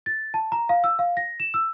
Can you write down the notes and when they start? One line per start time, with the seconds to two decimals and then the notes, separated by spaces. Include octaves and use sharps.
0.06 A6
0.34 A5
0.52 A#5
0.69 F5
0.84 E6
0.99 F5
1.17 A#6
1.40 E7
1.54 E6